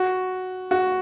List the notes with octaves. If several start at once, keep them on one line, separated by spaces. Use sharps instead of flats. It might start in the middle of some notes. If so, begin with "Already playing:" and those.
Already playing: F#4
F#4